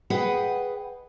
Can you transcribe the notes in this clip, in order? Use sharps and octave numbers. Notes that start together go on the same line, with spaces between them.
G#4 B4 D#5 F#5 G5